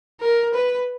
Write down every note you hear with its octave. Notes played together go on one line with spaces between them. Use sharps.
A#4
B4